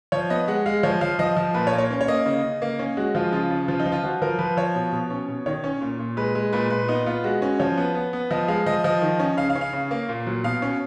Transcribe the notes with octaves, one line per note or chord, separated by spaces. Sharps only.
F3 C#5
B3 D#5
G#3 F#5
G#3 F5
F3 C#5
F3 F5
F3 D#5
F3
A#2 B4
C#5
A#3
C#5
C#4
C#5
A#3 D#5
C#3
C#3
A#3
C#4
G#3 F#4
F3 F4
C#3 F4
C#3
F3 F4
D#4
F3
F4
F3 F#4
F3 A#4
F3 B4
F3 C#5
B2
B2
C#4
B2
D#3 C#5
C#4
A#2
A#2
G#3 B4
G#3
A#2 B4
A#2 B4
B3 D#4
B3 F4
G#3 F#4
C#4
F3 C#5
B3
B3
B3
F3 D#5
G#3 F5
F3 D#5
F3 D#5
D#3
C#4
C#3 F5
F5
C#4
F5
C#3
A#3
A#2
F#3
B2 F5
C#4